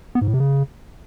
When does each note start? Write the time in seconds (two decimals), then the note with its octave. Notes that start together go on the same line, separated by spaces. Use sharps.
0.15 B3
0.21 G#2
0.28 A2
0.34 C3
0.40 C#3